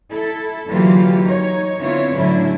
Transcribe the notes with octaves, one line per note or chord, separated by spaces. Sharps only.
E4 A4
D3 E3 F#3 A#3 F4 G4
D#4 C#5
D3 B3 C4 E4 F4 C#5
A2 D3 F#3 C#4 D4 E4